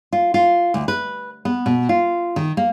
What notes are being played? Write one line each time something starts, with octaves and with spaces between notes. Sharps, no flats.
F4
F4
D2
B4
B3
B2
F4
D#3
A#3